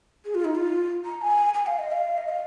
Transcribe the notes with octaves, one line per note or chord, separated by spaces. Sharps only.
G#4
F4
D#4
F4
A#5
G#5
G#5
F5
D#5
F5
D#5
F5